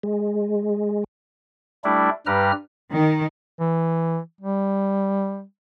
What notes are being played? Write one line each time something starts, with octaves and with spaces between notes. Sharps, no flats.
G#3
G3 A3 D4 E4
G2 G3 G4 B4 A#5 F6
D#3
E3
G3